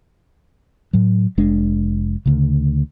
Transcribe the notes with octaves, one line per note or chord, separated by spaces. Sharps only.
A2 F#3
F1 G#3 D4
D2 C#3